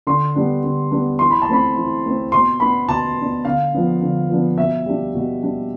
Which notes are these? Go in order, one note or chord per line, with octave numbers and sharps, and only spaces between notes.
D3 C6
G3 B3 D4
D3
G3 B3 D4
E3 C6
B5
A5
A3 C4 B5
E3
A3 C4
B2 C6
B3 D4 B5
B2 A5
B3 D4
D3 F5
F3 B3 D4
D3
F3 B3 D4
B2 E5
G3 D4
B2
G3 D4